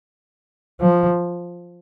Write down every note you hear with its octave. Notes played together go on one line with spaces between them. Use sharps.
F3